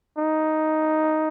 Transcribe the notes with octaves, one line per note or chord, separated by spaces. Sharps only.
D#4